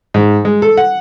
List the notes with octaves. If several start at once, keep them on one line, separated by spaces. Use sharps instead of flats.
G#2
G#3
A4
F#5